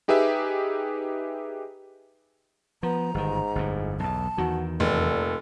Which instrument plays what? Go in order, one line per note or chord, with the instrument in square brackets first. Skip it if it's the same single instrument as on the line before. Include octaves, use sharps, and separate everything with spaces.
[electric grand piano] D#4 G4 G#4 B4 E5
[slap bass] F3 [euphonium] B3 [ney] A#5
[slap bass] G1 D#3 [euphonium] G#2
[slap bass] G1 F2 A2
[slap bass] B1 E2 [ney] A5
[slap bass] E2 D#3 [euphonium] F#4
[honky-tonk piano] F1 [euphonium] A#2 [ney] A4